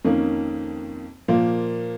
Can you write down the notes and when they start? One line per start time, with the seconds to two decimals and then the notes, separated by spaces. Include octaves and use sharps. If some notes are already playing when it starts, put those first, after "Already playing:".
0.04 F2 D#3 A#3 C#4
1.28 A#2 F3 A#3